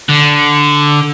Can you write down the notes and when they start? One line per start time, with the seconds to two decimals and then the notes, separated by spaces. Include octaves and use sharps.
0.09 D3